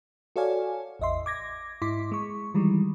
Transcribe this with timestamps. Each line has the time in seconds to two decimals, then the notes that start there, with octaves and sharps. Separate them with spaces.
0.36 F#4 A4 C#5 D5 F5 G#5
1.00 A1 E2 D#5 E5 C6
1.26 D6 G#6 A#6
1.82 G#2 E4 C6 D6 B6
2.12 G#3 C#6
2.54 D#3 E3 G3 G#3